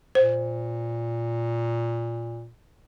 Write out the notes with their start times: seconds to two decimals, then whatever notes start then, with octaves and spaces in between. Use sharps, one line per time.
0.15 A#2 C5